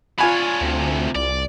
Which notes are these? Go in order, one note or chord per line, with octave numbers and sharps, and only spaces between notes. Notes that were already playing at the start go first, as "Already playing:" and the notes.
D4 F4 C#5 G#5 B5
D2 A2 C3
C2 D5